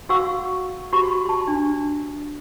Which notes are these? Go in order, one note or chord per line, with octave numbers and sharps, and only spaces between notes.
F#4 F5 F#5 C#6 E6
F#4 G4 B5 C#6
A5 C6
D4